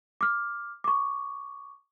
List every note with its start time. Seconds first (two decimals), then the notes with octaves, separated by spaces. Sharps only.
0.21 D6 F6
0.84 C#6 D6